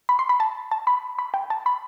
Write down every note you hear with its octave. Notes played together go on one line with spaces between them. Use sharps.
B5
C6
B5
A5
A5
B5
B5
G5
A5
B5